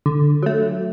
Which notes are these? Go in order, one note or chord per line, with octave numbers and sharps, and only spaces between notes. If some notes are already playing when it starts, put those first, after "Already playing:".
D3
F#3 A3